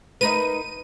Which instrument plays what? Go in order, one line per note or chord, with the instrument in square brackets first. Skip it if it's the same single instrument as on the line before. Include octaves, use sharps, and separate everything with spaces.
[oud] D#4 A#4 B4 [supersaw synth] D#7